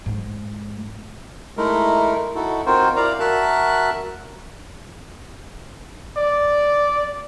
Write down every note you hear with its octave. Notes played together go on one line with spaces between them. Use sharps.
G#2 G#3
G#3 A3 D#4 E4 A#4
D#4 E4 F#4 A4
C4 D#4 F4 F#4 A#4 C5
E4 A#4 D5 F5 A#5
F#4 A#4 E5 A5 F#6
D5